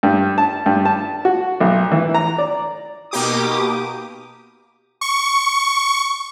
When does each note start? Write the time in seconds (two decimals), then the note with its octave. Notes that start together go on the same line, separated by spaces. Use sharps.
0.03 G2
0.38 A5
0.66 G2
0.85 A5
1.25 F#4
1.60 B1
1.92 E3
2.14 A#5
2.38 D5
3.11 B2 A#3 D#4 G4 D6 D#6
5.01 C#6